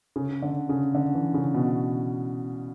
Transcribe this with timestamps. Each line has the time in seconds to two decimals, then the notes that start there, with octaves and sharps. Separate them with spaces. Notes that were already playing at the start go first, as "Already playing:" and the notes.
0.16 C#3
0.42 D3
0.69 C#3
0.95 D3
1.15 E3
1.34 C#3
1.54 B2